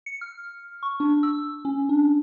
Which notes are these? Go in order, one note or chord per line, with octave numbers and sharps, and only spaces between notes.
C#7
F6
C#6
D4
E6
C#4
D4